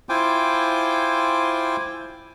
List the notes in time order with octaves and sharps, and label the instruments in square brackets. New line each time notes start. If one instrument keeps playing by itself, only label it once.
[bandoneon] E4 F4 C5 G5 G#5 D6